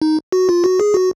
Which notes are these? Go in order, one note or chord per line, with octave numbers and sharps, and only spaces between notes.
D#4
F#4
F4
F#4
G#4
F#4